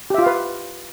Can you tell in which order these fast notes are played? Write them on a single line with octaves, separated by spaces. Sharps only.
G4 E5 F4 F5 B4